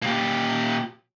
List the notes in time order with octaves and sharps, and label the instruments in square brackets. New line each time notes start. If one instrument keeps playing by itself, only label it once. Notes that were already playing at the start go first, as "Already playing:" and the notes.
[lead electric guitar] A#2 G4